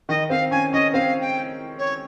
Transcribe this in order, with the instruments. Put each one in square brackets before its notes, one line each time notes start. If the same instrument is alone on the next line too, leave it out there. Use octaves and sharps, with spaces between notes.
[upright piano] D#3 [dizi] D#5
[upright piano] C4 [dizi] F5
[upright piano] C#4 [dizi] G#5
[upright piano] C#4 [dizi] D#5
[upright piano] C4 [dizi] F5
[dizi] G5
C#5